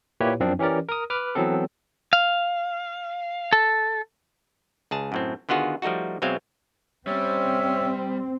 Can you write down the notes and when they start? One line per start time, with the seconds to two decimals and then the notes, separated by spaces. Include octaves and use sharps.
0.20 A#2 A#3 E4 G4 B4 C#5
0.40 F#2 F3 C4 D4
0.59 E3 C#4 G4 A#4 D5
0.89 A#4 D#6
1.10 B4 D6 F6
1.35 E3 F#3 B3 C4 A4
2.13 F5
3.53 A4
4.91 C#2 G#4 A5
5.12 F#2 A2 C4
5.49 D3 D#3 B3 F4 F#4 G#4
5.82 F3 G3 A3 D#4 F#4
6.22 B2 F#3 G#3 C4 E5 F5
7.07 G3 C4 C#4 E5